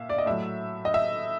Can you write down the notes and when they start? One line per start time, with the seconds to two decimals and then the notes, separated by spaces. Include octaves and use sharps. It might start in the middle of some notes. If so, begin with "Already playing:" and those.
Already playing: A#2 E5 F5
0.09 D5
0.18 D#5
0.26 A2 F#3 E5
0.85 D#5
0.94 E5